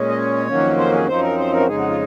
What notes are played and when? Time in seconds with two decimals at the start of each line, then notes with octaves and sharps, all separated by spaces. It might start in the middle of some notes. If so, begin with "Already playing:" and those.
Already playing: A#2 G#3 C#4
0.08 D#5
0.18 C#5
0.47 F2 D#3 F#3 A#3 C#4
0.77 C5
0.92 G#4
1.07 F#2 F3 C4 D#4 C5
1.22 A#4
1.38 C5
1.52 A#4
1.60 F#4
1.67 F2 C#3 G#3 D#4 G#4
1.77 F#4
1.88 F4